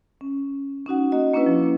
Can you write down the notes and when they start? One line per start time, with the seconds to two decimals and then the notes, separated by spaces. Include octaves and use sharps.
0.21 C#4
0.86 C#4 D#4 F#4 F#5
1.12 A#3 F#4 D#5
1.33 A#3 C#4 D4 E4 B4
1.46 F3